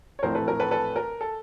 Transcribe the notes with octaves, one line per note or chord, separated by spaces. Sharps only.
C#5
A#1 A2 E3 A3 C4 A#4 C5
A4 B4
A#4
A4 B4
A4 B4
A#4
A4